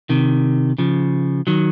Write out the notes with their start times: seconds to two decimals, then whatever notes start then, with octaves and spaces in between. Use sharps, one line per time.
0.10 C3 D#3
0.78 C#3 F3
1.47 D#3 F#3